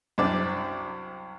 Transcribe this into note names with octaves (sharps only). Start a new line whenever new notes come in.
C2 F#2 C4 D4 D5